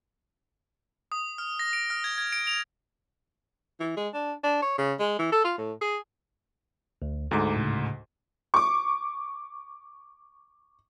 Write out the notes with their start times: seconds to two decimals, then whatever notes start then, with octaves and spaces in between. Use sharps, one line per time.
1.12 D#6
1.38 F6
1.59 A#6
1.73 D7
1.90 F6
2.04 G#6
2.18 G#6
2.32 D7
2.47 F7
3.80 E3
3.97 G#3
4.14 D4
4.43 D4
4.62 C#5
4.78 C#3
4.99 G#3
5.19 E3
5.32 A4
5.44 F4
5.58 A2
5.81 G#4
7.02 D2
7.31 D2 G#2 A4 A#5 D6
7.56 A2 C#3
8.54 C#6 D6